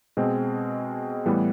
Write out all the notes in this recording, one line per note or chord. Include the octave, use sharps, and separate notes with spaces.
B2 G#3 C4
A2 E3 G3 B3